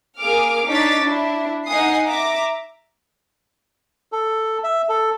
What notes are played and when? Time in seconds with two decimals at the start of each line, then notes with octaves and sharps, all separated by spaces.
0.18 A#3 G#4 D6 F6
0.67 D4 D#4 C#5 D6 A6 B6
1.02 D4 E4
1.66 D#4 F#5 G#5 D#6 C7
2.07 E5 A#5 D6
4.12 A4
4.64 E5
4.89 A4